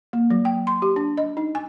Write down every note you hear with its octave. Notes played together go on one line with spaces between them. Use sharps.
A#3
F#3
G5
C6
G4
D4
D#5
D#4
G#5